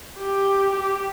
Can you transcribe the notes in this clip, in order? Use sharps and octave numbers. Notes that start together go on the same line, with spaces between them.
G4
G4